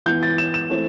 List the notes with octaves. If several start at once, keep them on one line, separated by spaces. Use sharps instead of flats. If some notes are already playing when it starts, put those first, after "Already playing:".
E3 B3 G6
A6
E7
E7
E3 A3 C4